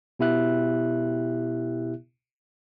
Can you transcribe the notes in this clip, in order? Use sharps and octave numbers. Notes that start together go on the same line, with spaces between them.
B2 B3 E4 G4 E5 F#6